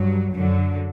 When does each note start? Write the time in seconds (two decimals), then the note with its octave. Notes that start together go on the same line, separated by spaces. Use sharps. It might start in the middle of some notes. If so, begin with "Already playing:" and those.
Already playing: G2 F#3
0.36 F#2 D3 F#3